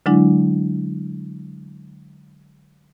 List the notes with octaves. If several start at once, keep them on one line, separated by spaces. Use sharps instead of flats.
D3 F#3 G#3 D4 E4